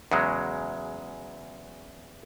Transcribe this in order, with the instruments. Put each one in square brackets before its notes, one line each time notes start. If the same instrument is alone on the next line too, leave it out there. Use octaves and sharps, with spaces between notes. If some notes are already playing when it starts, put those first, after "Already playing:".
[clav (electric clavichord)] E2 C#3 F#3 G#3